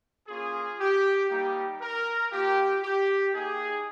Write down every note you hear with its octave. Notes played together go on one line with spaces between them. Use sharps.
A#3 C#4 F4 G#4
G4
G3 A#3 D#4 G4
A#4
A#3 F4 G4
G4
A#3 D#4 G4 G#4